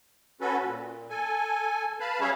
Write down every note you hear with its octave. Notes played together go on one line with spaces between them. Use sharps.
C#4 F#4 A4 B4
A#2
A4 G#5
B4 F5 A5 B5
G3 C#4 G#4 C#5 E5 F5